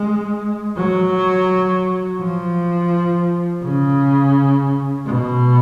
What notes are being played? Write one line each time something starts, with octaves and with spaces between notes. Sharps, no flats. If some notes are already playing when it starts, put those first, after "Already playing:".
Already playing: G#3
F#3
F3
C#3
B2